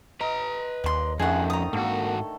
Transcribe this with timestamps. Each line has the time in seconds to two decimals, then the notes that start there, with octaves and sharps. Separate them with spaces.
0.21 B4 D#5 A#5
0.84 D#2 D5 C6
1.20 F2 D3 D#3 F3 A3 C#4 G#4 F#5
1.50 A#5 D#6
1.73 G#2 A#3 F#4 A4